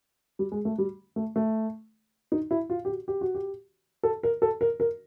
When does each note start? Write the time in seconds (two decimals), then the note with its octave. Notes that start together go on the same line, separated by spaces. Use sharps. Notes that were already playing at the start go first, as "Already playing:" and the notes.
0.39 G3
0.52 G#3
0.65 A3
0.78 G3
1.16 A3
1.36 A3
2.32 D#4
2.51 E4
2.70 F4
2.85 G4
2.88 F#4
3.08 G4
3.21 F#4
3.35 G4
4.03 A4
4.23 A#4
4.42 A4
4.61 A#4
4.80 A#4